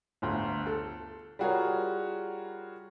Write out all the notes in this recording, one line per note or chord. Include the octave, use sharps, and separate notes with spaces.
G1 D2
A4
G3 F4 F#4 G#4 A#4 C#5